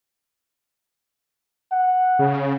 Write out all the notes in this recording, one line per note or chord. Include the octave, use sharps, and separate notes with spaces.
F#5
C#3